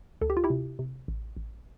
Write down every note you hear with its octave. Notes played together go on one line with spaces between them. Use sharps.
D2 A4
G4
F4
E4 G4
C3
C3
A1
A1